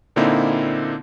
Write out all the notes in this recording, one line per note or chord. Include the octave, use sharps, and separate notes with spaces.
A#2 D3 A#3 C4 D#4 E4